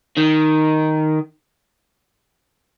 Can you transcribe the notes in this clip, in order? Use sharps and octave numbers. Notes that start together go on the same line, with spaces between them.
D#3